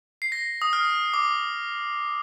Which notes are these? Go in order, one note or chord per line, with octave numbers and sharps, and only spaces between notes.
C7
A#6
D#6
F6
D6